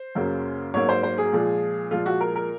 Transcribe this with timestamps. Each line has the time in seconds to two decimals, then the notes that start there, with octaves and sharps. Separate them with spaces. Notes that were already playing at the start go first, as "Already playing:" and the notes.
Already playing: C5
0.15 F#2 C#3 F#3 A#3
0.74 G#2 F#3 A#3 C#5
0.89 C5
1.03 C5
1.18 G#4
1.33 A#2 F3 G#3
1.91 A#2 F3 G#3 F4
2.06 F#4
2.21 A#4
2.35 A#4